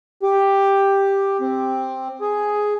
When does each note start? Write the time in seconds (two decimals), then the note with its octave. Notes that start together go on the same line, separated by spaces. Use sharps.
0.23 G4
1.40 C4
2.21 G#4